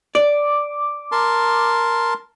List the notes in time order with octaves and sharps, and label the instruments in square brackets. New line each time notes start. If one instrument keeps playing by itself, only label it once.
[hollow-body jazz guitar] D5 [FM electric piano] D6
[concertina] A#4 A5 C6